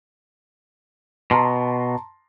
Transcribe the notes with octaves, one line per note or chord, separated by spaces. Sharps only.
B2 A5 A#5 C6